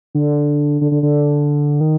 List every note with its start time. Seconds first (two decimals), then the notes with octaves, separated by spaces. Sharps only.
0.15 D3
0.81 D3
0.91 D3
1.03 D3
1.81 D#3